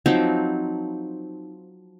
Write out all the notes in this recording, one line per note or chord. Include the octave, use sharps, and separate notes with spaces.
F3 F#3 C4 D#4